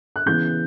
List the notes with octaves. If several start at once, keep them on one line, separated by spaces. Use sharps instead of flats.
F#6
C#3 E3 B3 G6